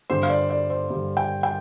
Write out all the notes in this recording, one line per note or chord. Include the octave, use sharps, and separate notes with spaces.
G2 D3 G3 C5
F5
D5
D5
C5
G2 D3 G3
G5
G5